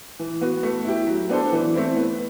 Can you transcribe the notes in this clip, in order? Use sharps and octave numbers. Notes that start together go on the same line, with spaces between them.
E3
B3 F#4
A3
E4 G4
F#3
B3 D4 A4 C5
E3
A3 C4 E4
B3